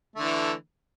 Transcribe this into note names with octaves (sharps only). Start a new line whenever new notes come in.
D3 E3 A3